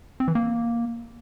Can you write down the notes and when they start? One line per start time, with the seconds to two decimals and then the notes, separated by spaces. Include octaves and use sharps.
0.20 C4
0.28 E3
0.35 A#3